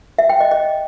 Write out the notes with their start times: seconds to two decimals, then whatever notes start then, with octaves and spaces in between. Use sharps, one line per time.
0.18 E5
0.29 G5
0.40 D#5
0.51 D#5